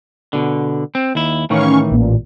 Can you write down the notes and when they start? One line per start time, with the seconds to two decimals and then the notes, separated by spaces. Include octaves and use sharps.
0.33 B2 D3
0.95 C4
1.15 D#2 E4
1.50 A2 D#3 E3 C#4 F5 C#6
1.90 A1 A#2